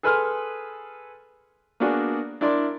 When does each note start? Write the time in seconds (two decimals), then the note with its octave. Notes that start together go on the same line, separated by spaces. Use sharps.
0.03 G#4 A4 B4 G#5 C6 F6
1.80 A#3 B3 D4 F#4 G#4
2.41 D4 E4 A#4 D5 C6 D6